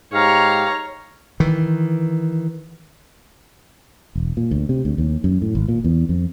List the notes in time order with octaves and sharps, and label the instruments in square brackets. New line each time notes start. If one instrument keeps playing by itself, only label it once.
[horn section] G#2 G4 F5 [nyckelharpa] C#5 A#5
[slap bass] D#3 E3
[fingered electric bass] E1
A#2
D2
C3
D2
D#2
F#2
A2
G#1
A#2
E2
F2